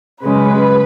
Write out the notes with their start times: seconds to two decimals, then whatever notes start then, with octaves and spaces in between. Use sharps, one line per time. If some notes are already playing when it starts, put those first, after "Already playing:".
0.23 F#2 C#3 G#3 B4